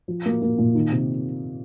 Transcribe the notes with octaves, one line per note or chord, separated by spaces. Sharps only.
F3
A#3
A#3
A#2
D#3
C3